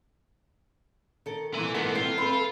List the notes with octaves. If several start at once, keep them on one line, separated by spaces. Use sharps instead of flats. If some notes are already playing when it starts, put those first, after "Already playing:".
D#3 A4
C2 A#2 E3 E4 G#5
G#2 B3 A4 A#4
C4 E4 F4 A4
C4 A4 B4